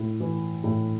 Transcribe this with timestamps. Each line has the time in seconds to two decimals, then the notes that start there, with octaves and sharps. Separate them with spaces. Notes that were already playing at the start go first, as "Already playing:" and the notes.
Already playing: A2
0.20 E3
0.64 A2